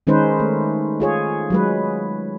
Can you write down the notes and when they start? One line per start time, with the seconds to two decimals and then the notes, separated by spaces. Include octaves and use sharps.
0.07 D#3 G#3 C#4 D#4 B4 C5
0.40 A3
1.00 F4 G#4 C#5
1.50 F#3 G#3 B4